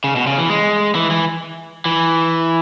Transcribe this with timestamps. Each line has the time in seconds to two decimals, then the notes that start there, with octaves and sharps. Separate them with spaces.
0.04 C#3
0.16 B2
0.27 C#3
0.38 E3
0.50 G#3
0.95 E3
1.10 E3
1.85 E3